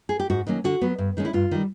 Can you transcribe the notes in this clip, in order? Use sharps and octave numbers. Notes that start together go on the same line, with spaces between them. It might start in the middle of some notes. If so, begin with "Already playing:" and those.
G#4
G4
G#2 F#4
D#3 F#3 A#3 C#4
D3 F#4
F#3 B3
G2
D#3 G#3 C#4
E4
G2 F4
D#3 G3